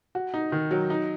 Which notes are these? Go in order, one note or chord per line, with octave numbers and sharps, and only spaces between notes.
F#4
D#4
D#3
F#3
D#4